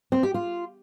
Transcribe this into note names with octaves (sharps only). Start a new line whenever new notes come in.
C4
G4
F4